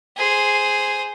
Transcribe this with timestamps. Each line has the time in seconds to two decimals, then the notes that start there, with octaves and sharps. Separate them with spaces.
0.17 G#4 C5